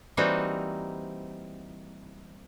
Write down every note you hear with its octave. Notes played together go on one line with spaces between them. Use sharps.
E3 G3 A#3 C4 D#4 F#4